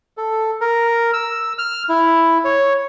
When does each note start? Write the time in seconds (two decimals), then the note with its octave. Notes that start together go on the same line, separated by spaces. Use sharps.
0.17 A4
0.61 A#4
1.13 E6
1.58 F6
1.89 E4
2.45 C#5